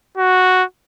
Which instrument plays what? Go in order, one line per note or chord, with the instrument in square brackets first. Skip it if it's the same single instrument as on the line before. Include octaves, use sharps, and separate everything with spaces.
[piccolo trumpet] F#4